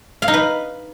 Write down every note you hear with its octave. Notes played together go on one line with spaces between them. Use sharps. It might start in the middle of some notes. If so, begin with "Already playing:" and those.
F5
D#4
B4